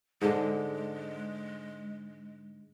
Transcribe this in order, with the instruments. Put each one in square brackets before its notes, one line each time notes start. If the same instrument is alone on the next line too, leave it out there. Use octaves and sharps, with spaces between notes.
[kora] G#2 D3 [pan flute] G#3